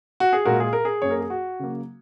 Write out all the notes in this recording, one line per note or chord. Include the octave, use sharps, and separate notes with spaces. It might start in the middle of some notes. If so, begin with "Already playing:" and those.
F#4
G#4
A#2 G#3 F#4 A#4
G#4
A#4
G#4
F#2 F#3 A#3 C#5
A#4
G#4
F#4
C#3 F#3 A#3